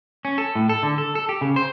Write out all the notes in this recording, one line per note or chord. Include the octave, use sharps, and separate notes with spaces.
C#4
A4
A2
A4
D3
A4
A4
G4
C#3
C5